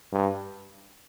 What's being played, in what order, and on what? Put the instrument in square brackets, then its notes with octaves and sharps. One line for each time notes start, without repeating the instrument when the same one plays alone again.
[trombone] G2